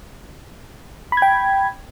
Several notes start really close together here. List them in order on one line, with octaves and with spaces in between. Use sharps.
B5 G#6 G5